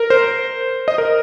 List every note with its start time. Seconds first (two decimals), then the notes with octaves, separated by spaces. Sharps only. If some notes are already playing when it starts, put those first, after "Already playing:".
Already playing: A#4
0.10 C5
0.88 D#5
0.98 A#4